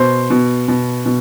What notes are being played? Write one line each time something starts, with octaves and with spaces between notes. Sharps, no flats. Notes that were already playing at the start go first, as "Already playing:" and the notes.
Already playing: B2 C5
B2
B2
B2